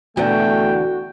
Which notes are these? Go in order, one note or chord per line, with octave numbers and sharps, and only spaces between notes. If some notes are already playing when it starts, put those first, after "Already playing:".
E2 B2 D3 A3 F#4 G5